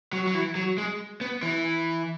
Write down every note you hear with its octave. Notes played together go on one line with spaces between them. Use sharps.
F#3
F#3
E3
F#3
G#3
B3
E3